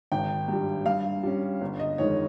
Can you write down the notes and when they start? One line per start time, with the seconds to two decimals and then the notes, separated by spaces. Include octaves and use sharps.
0.12 G#1 G5
0.48 G2 G3
0.86 G2 F5
1.23 G3 C#4
1.61 G1
1.79 D#5
1.98 F2 D#3 G#3 C#5